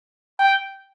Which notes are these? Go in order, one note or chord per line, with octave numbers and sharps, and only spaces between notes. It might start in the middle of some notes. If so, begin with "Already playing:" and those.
G5